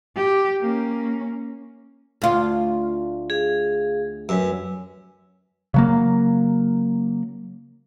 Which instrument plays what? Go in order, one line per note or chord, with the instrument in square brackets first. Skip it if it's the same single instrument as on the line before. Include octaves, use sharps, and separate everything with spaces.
[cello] G4
A#3 C#4
[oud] D2 F4
[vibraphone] G#4 F5
[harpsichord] F#2 [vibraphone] B4 G#5 E6
[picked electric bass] C#3 F#3 A#3